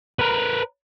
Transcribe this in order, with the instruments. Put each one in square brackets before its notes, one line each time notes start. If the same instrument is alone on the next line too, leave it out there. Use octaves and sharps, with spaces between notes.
[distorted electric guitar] A#4 B4